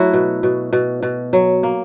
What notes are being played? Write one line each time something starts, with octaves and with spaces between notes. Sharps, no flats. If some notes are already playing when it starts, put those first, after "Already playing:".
Already playing: F#3 A3 E4 F#4
B2
B2
B2
B2
F#3
A#3